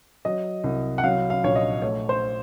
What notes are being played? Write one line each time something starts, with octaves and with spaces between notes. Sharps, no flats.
F#3 D#5
C2
F#5
F#3 F5
F5
A#1 C#5
D#5
A3 C#5
C5